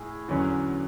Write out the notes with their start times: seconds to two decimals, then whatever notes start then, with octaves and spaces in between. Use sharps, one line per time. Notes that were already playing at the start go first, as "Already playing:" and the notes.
Already playing: A2 G#4
0.28 E2 D3 F#3 C#4